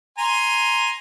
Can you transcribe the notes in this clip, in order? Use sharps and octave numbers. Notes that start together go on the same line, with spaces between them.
G#5 A#5 C6